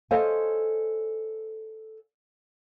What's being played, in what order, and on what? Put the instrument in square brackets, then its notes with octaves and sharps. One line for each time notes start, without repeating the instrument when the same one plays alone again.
[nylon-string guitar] A4 C5 C#5 D#5 F5 G#5